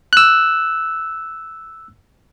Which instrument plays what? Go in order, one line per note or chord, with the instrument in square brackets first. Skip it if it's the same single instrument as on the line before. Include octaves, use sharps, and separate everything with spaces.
[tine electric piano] E6 F#6